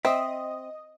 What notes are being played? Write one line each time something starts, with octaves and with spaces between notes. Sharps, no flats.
C4 D#5 E5 D#6